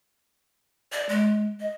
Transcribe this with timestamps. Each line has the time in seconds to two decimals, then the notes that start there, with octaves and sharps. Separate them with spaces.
0.92 D5
1.09 G#3
1.60 D#5